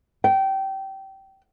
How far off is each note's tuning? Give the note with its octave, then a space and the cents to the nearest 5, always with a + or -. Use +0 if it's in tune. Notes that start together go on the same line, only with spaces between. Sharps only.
G5 -20